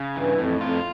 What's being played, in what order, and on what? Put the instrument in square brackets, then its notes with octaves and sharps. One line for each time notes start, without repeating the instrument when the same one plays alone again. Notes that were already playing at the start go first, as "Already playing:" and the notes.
Already playing: [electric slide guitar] C#3
[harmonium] G2 [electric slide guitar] E3
[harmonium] F2 [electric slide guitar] A2
[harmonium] F2 [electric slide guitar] F4